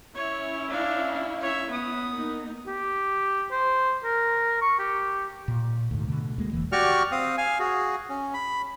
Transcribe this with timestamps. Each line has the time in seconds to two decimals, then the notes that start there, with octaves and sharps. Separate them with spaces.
0.15 C#4 E4 C#5
0.69 D4 F5
1.41 C#5 E5
1.70 B3 D#6
2.13 A#3 D#4
2.67 G4
3.51 C5
4.04 A#4
4.61 C#6
4.79 G4
5.48 A#2
5.91 D2 G#2
6.07 B2 D3 A3
6.38 D2 G#3 A#3
6.52 E1 E3 A#3
6.72 F#4 G4 D5 C#6 F6
7.12 C4 F5 D#6
7.38 F5 G#5
7.60 F#4 G#4
8.09 C#4
8.34 B5